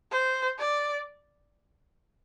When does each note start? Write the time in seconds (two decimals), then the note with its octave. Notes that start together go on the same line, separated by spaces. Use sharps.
0.12 C5
0.59 D5